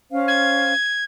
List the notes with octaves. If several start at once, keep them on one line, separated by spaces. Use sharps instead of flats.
C#4 C5 F5
G#6